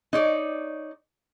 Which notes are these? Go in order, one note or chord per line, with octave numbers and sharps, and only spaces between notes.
D#4 C#5 D5